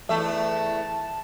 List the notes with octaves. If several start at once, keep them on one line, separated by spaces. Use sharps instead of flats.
E2 A3 E5 A5